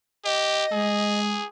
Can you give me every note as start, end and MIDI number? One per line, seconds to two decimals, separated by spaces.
0.25 0.65 67
0.25 1.20 75
0.72 1.39 56
0.72 1.46 68